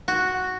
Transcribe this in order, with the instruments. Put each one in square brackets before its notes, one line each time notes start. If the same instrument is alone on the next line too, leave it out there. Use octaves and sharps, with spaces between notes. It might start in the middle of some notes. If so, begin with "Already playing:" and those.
[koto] F#4